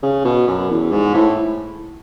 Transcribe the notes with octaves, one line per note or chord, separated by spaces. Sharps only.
C#3
B2
F#2
E2
G#2
A2